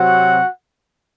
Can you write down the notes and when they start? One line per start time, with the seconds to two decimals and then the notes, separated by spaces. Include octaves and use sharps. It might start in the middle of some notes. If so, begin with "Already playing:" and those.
Already playing: C3 F#3 C4 F#4 F#5